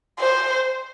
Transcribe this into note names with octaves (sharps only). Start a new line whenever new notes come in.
C5